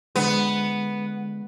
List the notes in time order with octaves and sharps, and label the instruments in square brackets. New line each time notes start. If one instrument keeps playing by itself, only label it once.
[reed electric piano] D3 G#3 [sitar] B3